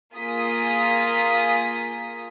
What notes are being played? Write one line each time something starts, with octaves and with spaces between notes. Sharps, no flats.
A#3 F4 G#4 A#4 D#6 B6